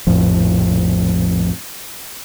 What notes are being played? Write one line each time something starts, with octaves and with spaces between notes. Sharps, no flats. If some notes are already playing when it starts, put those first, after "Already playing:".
A#1 F2 A2 F3